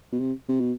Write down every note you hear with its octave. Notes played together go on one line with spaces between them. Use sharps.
B2
C3
C3
B2